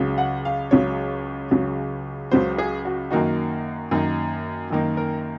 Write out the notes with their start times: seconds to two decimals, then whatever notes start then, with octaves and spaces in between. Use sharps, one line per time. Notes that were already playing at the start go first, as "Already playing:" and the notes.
Already playing: C#2 C#3 F#3
0.18 F#5
0.45 F5
0.71 C#2 C#3 F#3 C#5
1.51 C#2 C#3 F#3
2.31 C#2 C#3 F#3 C5
2.58 G#4
2.85 F#4
3.11 F#2 D#3 A#3 D#4 F#4
3.91 F#2 D#3 A#3 D#4
4.70 F#2 D#3 A#3 D#4
4.97 A#4